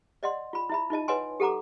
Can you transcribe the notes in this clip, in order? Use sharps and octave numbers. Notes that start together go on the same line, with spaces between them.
D5 D#5 F#5 C6
F4 B5
E4 E5 B5
D#4 F4 D#5 A5
B4 C#5 D#5 F#5 G#5 C6
G4 A4 F#5 A#5 D6